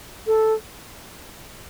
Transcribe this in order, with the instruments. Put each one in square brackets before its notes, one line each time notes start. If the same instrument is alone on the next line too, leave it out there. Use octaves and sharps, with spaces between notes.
[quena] A4